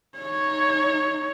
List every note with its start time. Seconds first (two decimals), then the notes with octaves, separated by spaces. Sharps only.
0.18 D#4 C#5